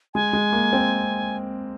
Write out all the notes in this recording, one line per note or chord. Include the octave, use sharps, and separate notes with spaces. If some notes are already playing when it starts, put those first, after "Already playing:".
G#3 G#5
G#3
A#3
C4